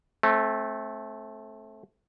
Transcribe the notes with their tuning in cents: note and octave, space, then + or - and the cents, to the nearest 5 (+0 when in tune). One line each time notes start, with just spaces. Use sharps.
A3 -15 C4 +30